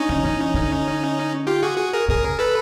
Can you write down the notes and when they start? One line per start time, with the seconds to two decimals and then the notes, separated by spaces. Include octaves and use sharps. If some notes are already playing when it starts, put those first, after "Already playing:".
Already playing: C#4 D#4
0.09 D3
0.23 E3
0.54 D3
1.47 F4 G4
1.63 F#4 G#4
1.78 F#4 G#4
1.93 G#4 A#4
2.08 C#3 G#4 A#4
2.39 A4 B4